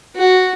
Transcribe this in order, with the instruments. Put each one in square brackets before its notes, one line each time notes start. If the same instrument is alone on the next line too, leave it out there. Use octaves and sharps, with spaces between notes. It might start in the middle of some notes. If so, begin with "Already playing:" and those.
[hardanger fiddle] F#4